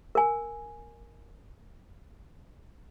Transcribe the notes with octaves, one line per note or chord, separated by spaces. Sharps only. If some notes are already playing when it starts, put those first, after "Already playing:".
A#4 G#5